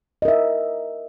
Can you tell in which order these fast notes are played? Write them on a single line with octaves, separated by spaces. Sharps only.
D#5 A#4 E5